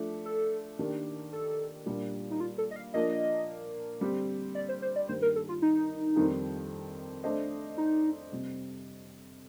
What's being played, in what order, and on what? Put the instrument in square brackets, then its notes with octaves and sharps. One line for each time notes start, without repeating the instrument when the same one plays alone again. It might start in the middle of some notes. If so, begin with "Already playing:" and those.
Already playing: [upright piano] F3 A3 D4
[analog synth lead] A4
[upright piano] D#3 A#3 D4 G4 A#4
[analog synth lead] A4
[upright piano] A#2 G3 D4 F4 A#4
[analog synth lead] D#4
F4
A4
D#5
F5
[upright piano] F3 A#3 D4 [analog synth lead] D#5
[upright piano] D3 G3 C4 G4
[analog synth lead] D5
C5
C5
D5
[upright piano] G2 D#3 G3 A#3 [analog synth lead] C5
[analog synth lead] A#4
A4
F4
D#4
[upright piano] F2 D#3 G3 C4
A3 D4 A4 C5 D#5
[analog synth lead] D#4
[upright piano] C3 G3 C4